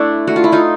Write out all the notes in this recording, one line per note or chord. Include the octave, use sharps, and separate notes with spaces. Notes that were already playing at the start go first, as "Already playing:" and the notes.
Already playing: A3 D4 E4
A3 F#4
F4
E4
D#4 F4